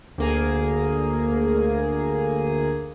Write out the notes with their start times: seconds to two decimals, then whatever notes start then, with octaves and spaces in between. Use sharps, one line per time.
0.18 D2 A#3 G#4